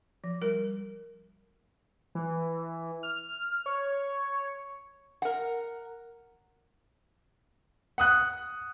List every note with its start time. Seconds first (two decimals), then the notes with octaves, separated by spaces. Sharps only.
0.24 F3
0.42 G3 A#4
2.15 E3
3.03 F6
3.66 C#5
5.22 A#4 F#5
7.98 F#5 D#6 F#6